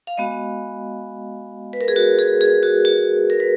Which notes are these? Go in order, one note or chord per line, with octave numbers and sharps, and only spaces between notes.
F5
G#3 B3 F#4 D#5
B4
A#4
G#4
F#4
G#4
G#4
F#4
F#4
A#4
B4